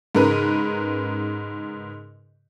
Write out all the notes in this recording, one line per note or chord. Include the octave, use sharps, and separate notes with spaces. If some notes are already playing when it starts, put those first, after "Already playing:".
G#2 C#3 A#4 B4